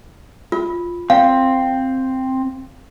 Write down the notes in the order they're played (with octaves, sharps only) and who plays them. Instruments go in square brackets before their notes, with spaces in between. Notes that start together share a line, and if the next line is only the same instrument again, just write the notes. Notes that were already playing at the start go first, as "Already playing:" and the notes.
[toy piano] F4
[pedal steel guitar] C4 [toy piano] F5